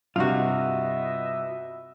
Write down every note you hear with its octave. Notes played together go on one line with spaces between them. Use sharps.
G2 C3 B3 F4 F#4 D#5 E5